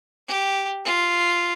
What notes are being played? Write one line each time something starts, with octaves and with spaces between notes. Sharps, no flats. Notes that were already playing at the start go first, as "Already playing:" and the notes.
G4
F4